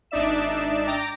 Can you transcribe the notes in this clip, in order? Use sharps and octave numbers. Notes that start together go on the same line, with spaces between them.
G#1 D4 D#4 D5 E5 E7
G5 A#5 D6 A6 A#6